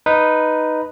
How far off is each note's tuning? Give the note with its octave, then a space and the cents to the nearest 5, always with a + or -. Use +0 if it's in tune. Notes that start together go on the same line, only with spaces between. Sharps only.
D#4 +0 B4 +0